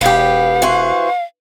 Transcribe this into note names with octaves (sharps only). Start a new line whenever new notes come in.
E1 B3 G4 F5
E3 F#4 C5